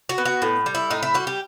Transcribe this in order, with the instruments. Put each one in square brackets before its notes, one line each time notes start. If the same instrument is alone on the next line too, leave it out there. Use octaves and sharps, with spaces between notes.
[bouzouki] F#4
B3
F#4
A2
G3
E4
A2 D#4
E4
G3 F#4
G4